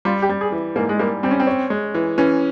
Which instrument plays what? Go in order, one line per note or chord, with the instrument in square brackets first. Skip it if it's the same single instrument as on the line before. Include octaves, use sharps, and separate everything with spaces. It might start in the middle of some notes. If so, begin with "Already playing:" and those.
[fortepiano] G3 [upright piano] F4
[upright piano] G4
[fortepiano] G3
[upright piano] G#4
[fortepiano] E3
[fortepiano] G#2 [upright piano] A#3
[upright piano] G#3
[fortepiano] G3 [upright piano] A#3
[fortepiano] G3 [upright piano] C4
[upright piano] C#4
C4
[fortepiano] C#4
G#3
E3
[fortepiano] E3 [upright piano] C#4